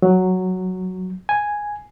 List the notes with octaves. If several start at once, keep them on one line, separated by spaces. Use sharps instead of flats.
F#3
G#5